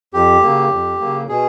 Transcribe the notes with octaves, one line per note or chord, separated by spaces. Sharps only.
F2 G4
C#3 F#3 A#3
F2
C#3 F#3 A#3
B2 G#4